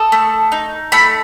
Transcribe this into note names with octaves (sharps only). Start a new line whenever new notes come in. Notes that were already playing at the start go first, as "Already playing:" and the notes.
Already playing: A4 D#6
A3
D#4
A3 B5